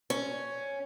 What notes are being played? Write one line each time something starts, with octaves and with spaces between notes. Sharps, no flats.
C#4